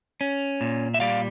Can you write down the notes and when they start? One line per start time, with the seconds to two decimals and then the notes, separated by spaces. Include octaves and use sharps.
0.21 C#4
0.61 A#2
0.94 E5
1.00 G3 D5 F5